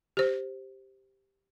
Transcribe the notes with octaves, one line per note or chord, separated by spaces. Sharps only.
G4 C5